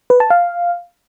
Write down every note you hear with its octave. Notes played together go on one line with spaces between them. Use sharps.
B4
A5
F5